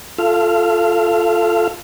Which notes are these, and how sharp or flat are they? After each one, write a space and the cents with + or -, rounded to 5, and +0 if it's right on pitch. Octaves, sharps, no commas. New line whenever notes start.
F4 +0 A4 +0 F5 -25